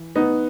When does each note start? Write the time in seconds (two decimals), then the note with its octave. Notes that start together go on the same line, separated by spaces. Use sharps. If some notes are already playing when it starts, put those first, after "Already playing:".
Already playing: E3
0.15 B3 D#4